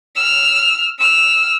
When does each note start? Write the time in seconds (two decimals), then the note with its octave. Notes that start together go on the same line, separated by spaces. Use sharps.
0.16 E6 F6
0.99 E6 F6